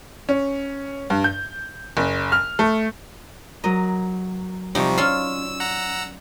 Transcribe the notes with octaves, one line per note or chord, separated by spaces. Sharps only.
C#4
G2
G6
F#1
F6
A3
F#3 A#4 D#5
C3 F3 G3 D#4 D5 C#6
C#4 F4 E6
F#5 A#5 E6